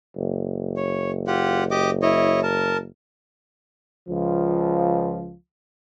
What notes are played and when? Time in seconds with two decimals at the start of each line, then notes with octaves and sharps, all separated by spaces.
0.16 F#1
0.77 C#5
1.27 F4 G4 F#5
1.71 G4 D#5 D6
2.02 E4 C#5 D#5
2.43 A#4 A5
4.09 C#2 F3